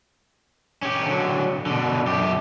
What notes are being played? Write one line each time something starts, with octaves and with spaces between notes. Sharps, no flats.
C#4 G4
D3 F#3
B2 D3
F#2 G4